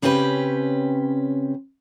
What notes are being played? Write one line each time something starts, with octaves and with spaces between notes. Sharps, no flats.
C#3 C4 C#4 G4 B4